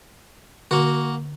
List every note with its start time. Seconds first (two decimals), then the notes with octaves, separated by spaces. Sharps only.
0.71 D3 A#3 F#4